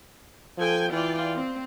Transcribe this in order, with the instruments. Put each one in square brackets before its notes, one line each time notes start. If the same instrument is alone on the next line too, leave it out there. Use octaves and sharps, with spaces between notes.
[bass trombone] F3 [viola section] A4 G5 G#5
[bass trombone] E3 [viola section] F4 D5 G5
[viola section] C4